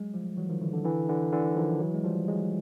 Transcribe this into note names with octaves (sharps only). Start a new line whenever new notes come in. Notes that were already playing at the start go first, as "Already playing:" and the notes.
Already playing: F#3 G#3
F3 G3
E3 F#3
D#3 F3
D3 E3
D3
D3 E3
D3 E3
D3 E3
D#3 F3
E3 F#3
G#3
F3 G3
F#3 G#3